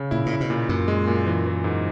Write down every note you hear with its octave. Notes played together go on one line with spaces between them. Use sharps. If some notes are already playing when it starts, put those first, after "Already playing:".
Already playing: C#3
A#2 E4
A#2 E4
B2
A#2
F#2 A#2
G#3
A#2
E3
E3
G#2